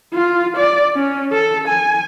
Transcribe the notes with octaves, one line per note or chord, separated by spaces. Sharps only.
F4
D5
C#4
A4
G#5